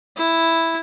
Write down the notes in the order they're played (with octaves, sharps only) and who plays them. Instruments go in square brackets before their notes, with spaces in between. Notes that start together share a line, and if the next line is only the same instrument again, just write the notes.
[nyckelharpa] E4